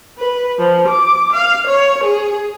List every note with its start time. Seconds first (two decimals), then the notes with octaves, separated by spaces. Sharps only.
0.18 B4
0.59 F3
0.88 D6
1.33 F5
1.67 C#5
2.04 G#4